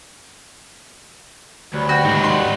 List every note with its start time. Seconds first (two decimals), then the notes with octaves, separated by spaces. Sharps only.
1.73 D2 F#3 G3 B4
1.89 F#4 G5
2.05 D#2 G#2 D#4 D5
2.24 C6